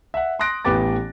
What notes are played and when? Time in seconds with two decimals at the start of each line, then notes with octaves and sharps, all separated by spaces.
0.14 E5 F#5
0.39 C6 D#6 F#6 A#6 D7
0.65 A1 E3 B3 G4 D6 A6